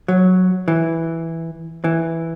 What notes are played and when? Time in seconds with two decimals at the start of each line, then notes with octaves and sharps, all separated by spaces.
0.08 F#3
0.68 E3
1.84 E3